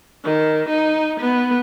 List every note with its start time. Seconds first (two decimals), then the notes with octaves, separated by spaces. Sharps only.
0.24 D#3
0.69 D#4
1.20 B3